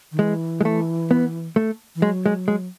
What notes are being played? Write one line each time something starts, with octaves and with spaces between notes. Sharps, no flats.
D#3
E3 G#3
G#3
A3
B3
A3
E3
F#3 G#3
G#3
G#3